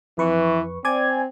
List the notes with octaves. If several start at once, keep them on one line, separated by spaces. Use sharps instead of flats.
F2 E3 B4 C#6
C4 D5 G#5 G#6